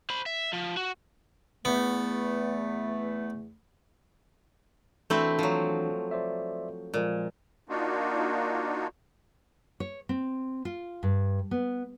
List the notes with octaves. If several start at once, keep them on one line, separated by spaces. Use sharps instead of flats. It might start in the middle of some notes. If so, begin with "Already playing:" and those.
C5 B5
E5
F3
F#4
E2 A3 B3
E3 A3 C4 D4 E4 F#4
F3 F#3
C5 D5 E5
A#2 F3 G#3
A#3 D4 D#4 F4 F#4
C#5
C4
F4
G2
B3